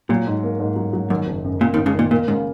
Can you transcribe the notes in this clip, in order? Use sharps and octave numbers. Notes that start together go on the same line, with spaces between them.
A#2 F#3
G#2
A#3
G#2
F#3
F#3
F#2 D#3
F#1
F#2
F#2 A#2
D#2 D#3
F#2
C#2 C#3
A#2 D#3
A#2 A#3
G#2 C#3